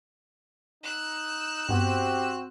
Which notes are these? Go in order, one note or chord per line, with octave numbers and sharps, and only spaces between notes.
D#4 E6 F#6
G2 B3 C4 F#4 G4 C5